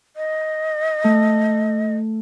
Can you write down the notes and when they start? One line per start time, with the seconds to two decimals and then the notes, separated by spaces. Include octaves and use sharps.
0.16 D#5
1.04 A3